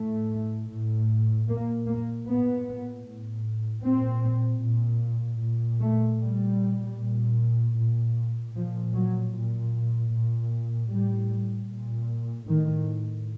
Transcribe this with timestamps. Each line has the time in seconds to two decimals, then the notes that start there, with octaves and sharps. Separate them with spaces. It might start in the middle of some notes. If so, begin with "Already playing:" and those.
Already playing: A2 A3
0.69 A2
1.48 A#2 A#3
1.87 A#3
2.27 A#2 B3
3.06 A2
3.83 A#2 C4
4.62 A#2
5.40 A#2
5.81 A3
6.20 A#2 G3
6.98 A#2
7.77 A#2
8.55 A#2 F3
8.94 F#3
9.34 A#2
10.12 A#2
10.90 A2 G3
11.70 A#2
12.48 A2 D#3